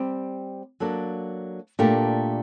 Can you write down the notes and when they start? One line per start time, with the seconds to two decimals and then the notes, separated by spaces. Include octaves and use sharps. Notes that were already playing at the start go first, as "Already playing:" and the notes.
Already playing: G3 C4 G4
0.80 F#3 A#3 D4 A4
1.79 A#2 A3 D4 G4 A#4